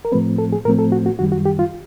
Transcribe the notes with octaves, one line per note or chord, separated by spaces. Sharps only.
A#4
A2 F3 A3 C4 B4
A4
G#4
A2 F3 A3 C4 A#4
A4
F#4
F#4
F#2 D#3 G3 F#4
F#4
G4
F4